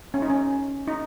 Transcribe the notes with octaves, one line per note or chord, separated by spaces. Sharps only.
C#4
D#4
C#4
D#4